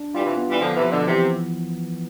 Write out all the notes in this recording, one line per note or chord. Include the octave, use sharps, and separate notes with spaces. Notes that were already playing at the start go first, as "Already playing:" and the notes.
Already playing: D4
E3 G3 F4
C3 E3
B3
E3 G3
D3 F3 B3
C3 E3
F3
B2 D3
C3 E3